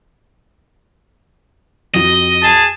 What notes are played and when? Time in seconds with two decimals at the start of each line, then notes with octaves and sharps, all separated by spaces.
1.94 F2 F#4 D#5
2.44 G#4 A5